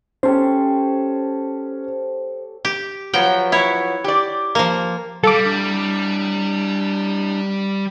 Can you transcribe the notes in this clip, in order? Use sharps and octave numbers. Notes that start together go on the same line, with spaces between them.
C#4 G4 A4 C5 C#5
G4
F3 F#3 B3 G5
E4 C#5
G4 D5
F3 A#3
C3 G3 A4 F5 D6
D4 E4